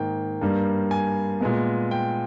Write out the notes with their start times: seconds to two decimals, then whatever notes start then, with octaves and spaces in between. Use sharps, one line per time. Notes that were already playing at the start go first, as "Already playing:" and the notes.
Already playing: G#2 D#3 A#3 G5
0.41 G2 G3 A#3
0.91 G#5
1.41 A#2 G#3 B3
1.91 G5